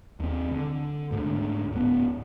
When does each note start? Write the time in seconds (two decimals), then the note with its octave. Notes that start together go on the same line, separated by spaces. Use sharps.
0.20 D#2 C4
0.51 D3
1.11 D2 G#2 B2 D3
1.73 D1 B3